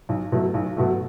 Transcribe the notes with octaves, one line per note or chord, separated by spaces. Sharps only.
B1
B2 F#3 A3
B1
B2 F#3 A3